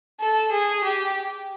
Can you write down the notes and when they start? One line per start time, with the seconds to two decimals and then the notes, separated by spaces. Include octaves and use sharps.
0.21 A4
0.52 G#4
0.84 G4